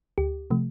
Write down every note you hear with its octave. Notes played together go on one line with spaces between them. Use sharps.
D2 G4
C3 F3 A3